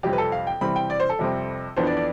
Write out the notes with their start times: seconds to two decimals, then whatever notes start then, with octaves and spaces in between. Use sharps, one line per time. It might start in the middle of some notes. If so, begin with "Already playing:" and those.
0.03 F2 C3 G3 C4 G4
0.13 B4
0.18 A4
0.32 F5
0.47 G5
0.61 C3 E3 G3 C4 B5
0.76 G5
0.90 D5
1.00 C5
1.09 A4
1.19 F2 C3 G3 C4
1.77 F2 E3 B3 D4 C5
1.87 D5
1.97 D5